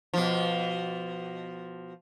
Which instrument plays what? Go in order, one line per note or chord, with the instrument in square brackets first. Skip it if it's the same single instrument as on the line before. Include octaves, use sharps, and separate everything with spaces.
[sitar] B2 F3